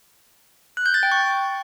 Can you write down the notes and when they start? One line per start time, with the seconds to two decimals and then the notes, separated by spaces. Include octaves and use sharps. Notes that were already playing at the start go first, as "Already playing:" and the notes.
0.77 F#6
0.86 G6
0.94 A6
1.03 G5
1.11 C#6